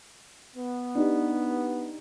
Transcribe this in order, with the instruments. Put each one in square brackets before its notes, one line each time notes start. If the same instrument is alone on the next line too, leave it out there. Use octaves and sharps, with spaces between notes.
[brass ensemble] B3
[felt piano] D4 D#4 G4